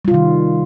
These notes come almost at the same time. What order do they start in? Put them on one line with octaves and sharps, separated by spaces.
G3 F4 C3 D#3